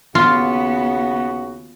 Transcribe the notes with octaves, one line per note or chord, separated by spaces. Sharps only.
D#2 C#3 B3 F4 F#4